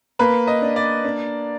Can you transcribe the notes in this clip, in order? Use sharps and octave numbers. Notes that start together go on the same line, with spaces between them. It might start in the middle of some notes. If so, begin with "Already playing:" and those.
A#3 B4 B5
D#5
D4
D5
D4